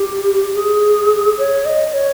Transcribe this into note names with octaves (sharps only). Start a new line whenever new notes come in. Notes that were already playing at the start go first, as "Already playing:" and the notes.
Already playing: G4
G#4
C#5
D#5
C#5